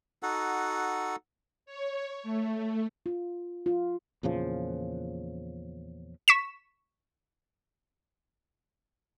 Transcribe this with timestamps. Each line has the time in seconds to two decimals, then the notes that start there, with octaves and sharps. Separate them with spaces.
0.23 D#4 F#4 A4 F#5
1.66 C#5
2.23 A3
3.06 F4
3.66 F4
4.23 E2 A#2 C#3 F3
6.28 C#6 B6 E7